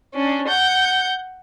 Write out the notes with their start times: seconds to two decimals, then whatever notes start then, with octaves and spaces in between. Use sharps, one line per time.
0.14 C#4 D4
0.48 F#5 G6